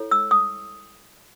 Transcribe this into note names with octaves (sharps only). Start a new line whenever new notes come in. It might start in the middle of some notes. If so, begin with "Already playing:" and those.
Already playing: E4 A4 C#5
E6
D#6